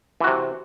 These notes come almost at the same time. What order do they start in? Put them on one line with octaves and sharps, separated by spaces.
E3 F#4 C3